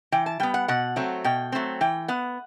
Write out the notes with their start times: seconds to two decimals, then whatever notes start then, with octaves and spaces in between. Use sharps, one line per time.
0.12 E3 G5
0.26 A5
0.40 G3 B3 G5
0.54 F#5
0.68 B2 F#5
0.96 F#3 A3 C4
1.24 B2 G5
1.52 F#3 A3 C4
1.81 E3 G5
2.08 B3 F#5